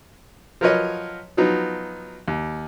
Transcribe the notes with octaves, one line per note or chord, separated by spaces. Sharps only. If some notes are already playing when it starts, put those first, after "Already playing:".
F3 F#3 A#4 B4 C#5 D#5
F3 F#3 B3 D#4
D#2